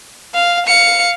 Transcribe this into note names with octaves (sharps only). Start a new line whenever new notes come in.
F5
F5 C#7